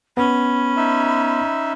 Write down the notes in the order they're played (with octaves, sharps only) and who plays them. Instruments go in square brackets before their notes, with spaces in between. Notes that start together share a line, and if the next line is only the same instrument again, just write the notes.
[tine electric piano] B3 [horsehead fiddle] C#4 [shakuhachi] B5
[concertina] D#4 E5